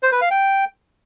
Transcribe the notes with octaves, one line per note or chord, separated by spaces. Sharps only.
C5
B4
F5
G5